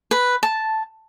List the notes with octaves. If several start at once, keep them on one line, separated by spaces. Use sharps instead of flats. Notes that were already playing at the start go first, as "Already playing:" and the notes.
B4
A5